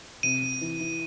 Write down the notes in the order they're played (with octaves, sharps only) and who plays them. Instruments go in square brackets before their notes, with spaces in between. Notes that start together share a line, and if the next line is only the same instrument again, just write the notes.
[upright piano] C3 [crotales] D#7
[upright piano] C3
E3
E3